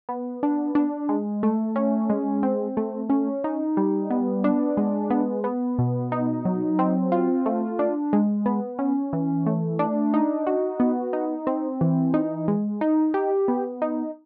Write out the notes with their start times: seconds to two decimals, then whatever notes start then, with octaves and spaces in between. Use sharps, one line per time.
0.09 B3
0.43 D4
0.75 D4
1.09 G#3
1.43 A3
1.76 C#4
2.10 G#3
2.43 C4
2.77 A3
3.10 C#4
3.44 D#4
3.77 G3
4.10 B3
4.44 D4
4.77 G#3
5.10 B3
5.44 B3
5.79 B2
6.12 D#4
6.45 F#3
6.79 C4
7.12 F4
7.46 A3
7.79 D4
8.13 G#3
8.46 B3
8.79 C#4
9.13 E3
9.46 A3
9.79 D4
10.14 D#4
10.47 F#4
10.80 B3
11.13 D#4
11.47 C4
11.81 E3
12.14 D#4
12.48 G#3
12.81 D#4
13.14 G4
13.48 B3
13.82 D#4